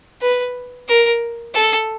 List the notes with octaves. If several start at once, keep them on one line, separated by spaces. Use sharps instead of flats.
B4
A#4
A4